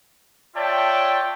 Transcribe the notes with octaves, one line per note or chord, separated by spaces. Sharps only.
F4 C#5 D5 E5 G5 A5